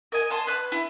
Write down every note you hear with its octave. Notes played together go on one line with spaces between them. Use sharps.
A#4 D#5 G#5
D#5 A5 C6
B4 F#6
E4